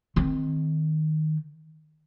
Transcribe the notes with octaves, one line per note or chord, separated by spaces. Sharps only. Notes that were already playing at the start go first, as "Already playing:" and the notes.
D#3 C4